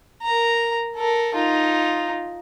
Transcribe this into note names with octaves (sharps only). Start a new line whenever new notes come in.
A#4 A#5
A4 A#4
D#4 F4